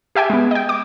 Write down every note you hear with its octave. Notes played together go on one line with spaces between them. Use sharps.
G4 E5 G5 G#5
G#3 B3
D#5 G5
D6